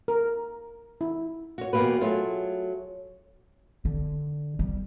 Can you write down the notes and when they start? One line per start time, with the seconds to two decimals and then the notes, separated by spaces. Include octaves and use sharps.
0.08 A#4
1.01 E4
1.58 F#4 C#5
1.73 E2 B2 G#3 A#3 G4 B4
2.01 F#3 A3 F4 G#4
3.85 D3
4.59 G3